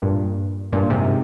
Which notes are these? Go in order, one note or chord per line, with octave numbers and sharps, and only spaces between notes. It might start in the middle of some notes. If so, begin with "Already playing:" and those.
G2 A#2
G2 A#2
G#2 C3